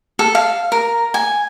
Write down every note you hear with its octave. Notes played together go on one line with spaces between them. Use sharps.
A4
F5
A#4
G#5